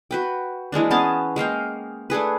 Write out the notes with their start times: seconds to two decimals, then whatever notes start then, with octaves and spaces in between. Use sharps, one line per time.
0.11 F#4 B4 G5
0.72 E3 G#3 A#3 D4
0.91 B3 C#4 G#4 A5
1.36 G#3 A#3 F5 G5
2.10 A3 D4 G#4 B4